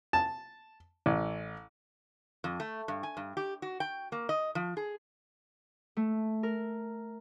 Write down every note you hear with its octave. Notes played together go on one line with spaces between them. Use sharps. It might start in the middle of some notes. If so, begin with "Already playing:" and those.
A5
A1
F2
A3
G2
G#5
G2
G4
F#4
G5
A#3
D#5
F3
G#4
A3
A#4